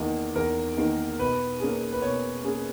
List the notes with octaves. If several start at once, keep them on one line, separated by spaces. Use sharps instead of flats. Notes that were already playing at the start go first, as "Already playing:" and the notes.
Already playing: E2 D#3 A#3 D#4
E2 A#4
D#3 A#3 D#4
B2 B4
A#3 C#4 G#4
B4
B2 C#5
A#3 C#4 G#4